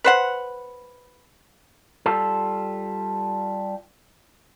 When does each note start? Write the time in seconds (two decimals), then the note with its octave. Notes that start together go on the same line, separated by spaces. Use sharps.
0.04 B4 C5 F#5
2.06 G3 F4 A4